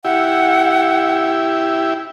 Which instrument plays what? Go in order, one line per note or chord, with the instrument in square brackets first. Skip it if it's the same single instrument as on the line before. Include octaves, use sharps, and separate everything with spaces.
[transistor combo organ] E4 G4 [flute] F#5